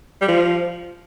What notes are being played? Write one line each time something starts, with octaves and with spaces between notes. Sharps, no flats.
G3
F3